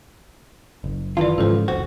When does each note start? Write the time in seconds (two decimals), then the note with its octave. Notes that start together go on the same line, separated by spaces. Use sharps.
0.84 F#1
1.17 D#3 E3 F4 D5
1.38 G#2 C#3 F3 A4 C5
1.68 E1 A#1 F#4 C5